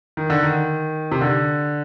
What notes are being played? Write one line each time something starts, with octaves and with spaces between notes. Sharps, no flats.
D#3
D3
D#3
C3
D3